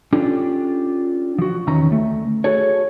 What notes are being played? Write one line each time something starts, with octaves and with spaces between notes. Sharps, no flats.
C#4 D4 F4 G4 A4
F3 F#4
E2 D#3 C#4 A#5
D2 A3
F#4 G#4 A4 C#5